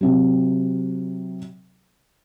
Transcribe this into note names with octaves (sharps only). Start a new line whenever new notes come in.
C3 F#3